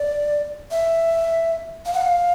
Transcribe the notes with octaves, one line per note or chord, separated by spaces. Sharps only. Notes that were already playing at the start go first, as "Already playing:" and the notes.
Already playing: D5
E5
F5
F#5
F5